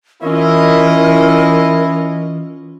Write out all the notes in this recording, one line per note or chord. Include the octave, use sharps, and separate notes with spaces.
E3 C#4 E4 F4 A#4 D#5